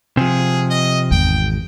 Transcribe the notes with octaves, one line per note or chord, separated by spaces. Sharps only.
C3 F3 G#4
D#5
G#1 E2 G5